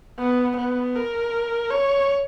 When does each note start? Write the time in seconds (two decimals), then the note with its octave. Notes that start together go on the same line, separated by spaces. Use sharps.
0.19 B3
0.58 B3
0.96 A#4
1.71 C#5